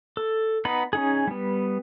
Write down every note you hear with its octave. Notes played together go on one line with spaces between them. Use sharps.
A4
B3 D#4 B5
C#4 D#4 G#4
G3 B3